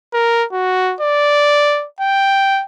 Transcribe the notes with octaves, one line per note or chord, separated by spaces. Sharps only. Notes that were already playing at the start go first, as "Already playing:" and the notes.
A#4
F#4
D5
G5